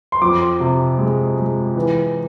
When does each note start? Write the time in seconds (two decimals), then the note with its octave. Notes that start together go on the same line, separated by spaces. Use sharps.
0.12 C6
0.21 F2 D6
0.60 C3
0.98 G#3
1.37 G#3
1.76 E3